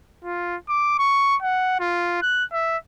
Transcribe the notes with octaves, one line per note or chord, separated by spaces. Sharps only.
F4
D6
C#6
F#5
F4
F#6
E5